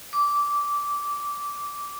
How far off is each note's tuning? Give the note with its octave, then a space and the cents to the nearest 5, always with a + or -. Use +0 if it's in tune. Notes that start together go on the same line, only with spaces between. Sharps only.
D6 -15